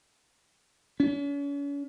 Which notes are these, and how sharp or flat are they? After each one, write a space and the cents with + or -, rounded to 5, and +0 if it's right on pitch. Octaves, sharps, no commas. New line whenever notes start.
C#4 +40